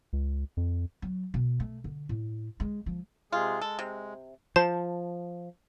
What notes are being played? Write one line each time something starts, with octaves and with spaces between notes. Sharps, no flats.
C#2
F2
F#3
B2
A3
D3
A2
G#3
F3
C3 G#3 F4 G#4
G#3 A4
C3
F3 C5 A5